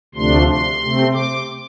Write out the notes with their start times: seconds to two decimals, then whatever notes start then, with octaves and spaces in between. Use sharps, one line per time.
0.15 D2 C3 F3 A3 D4 C6
0.48 C6
0.81 C3 A3 C4
1.14 D6